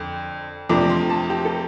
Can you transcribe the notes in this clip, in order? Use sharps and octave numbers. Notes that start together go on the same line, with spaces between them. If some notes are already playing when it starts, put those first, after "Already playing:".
Already playing: F2 D3
F2 C3 F3 A3 D4 D6
C6
A5
G4
A4